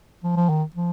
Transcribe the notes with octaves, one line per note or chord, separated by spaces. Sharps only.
F3
F3
D#3
F3